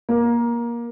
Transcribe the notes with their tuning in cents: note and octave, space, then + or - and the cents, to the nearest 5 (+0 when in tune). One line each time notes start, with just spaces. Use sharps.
A#3 +20